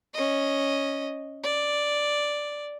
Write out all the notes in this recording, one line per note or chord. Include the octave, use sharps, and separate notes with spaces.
C#4 D#5
D5